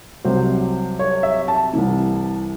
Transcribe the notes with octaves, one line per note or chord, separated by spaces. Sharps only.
C2 C3 F#3 C5
C#5
E5
A5
C2 C3 E3